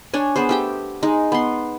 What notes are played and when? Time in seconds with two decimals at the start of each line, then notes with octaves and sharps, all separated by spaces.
0.14 D4 C#5 G#5
0.36 B3 G#4 C5
0.49 A3 G4 G5
1.03 G#3 D#4
1.32 B3 C6